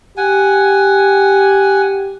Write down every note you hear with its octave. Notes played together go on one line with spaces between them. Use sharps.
G4 F#5 G#5